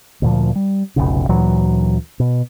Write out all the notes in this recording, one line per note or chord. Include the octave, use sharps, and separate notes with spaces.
D2 A#2 F3
G3
F1 B1 C#3
D2 A#2 E3 F#3
B2